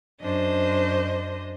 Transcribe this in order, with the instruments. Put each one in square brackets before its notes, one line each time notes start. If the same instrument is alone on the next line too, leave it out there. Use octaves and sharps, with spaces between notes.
[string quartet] F#2 D4 C5 D#5